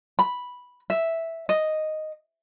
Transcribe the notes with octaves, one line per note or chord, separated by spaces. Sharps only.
B5
E5
D#5